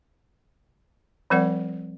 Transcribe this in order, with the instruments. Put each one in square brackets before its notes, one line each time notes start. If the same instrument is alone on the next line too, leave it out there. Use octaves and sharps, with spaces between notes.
[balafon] F3 G3 C4 A#4 D5 F#5